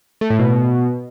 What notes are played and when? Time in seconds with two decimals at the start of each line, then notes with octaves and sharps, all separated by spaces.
0.21 A3
0.30 A2
0.39 B2